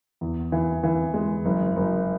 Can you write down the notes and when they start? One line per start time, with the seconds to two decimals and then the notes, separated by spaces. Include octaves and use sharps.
0.21 E2
0.52 E3
0.83 E3
1.14 G#3
1.45 F#1
1.76 F#1